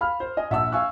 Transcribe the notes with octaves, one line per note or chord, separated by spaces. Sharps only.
F5 B5 F6
C5
D#5 G#5
A#1 E5 F#5 A5 E6
F5 G#5 C#6 E6 F#6